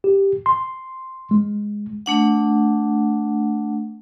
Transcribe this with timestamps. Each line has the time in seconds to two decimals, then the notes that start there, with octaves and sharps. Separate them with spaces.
0.04 G4
0.46 C6
1.31 G#3
2.06 A3 D4 F#5